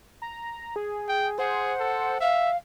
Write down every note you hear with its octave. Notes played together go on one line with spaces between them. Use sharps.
A#5
G#4
G5
G#4 C5 F#5
A4
E5 F5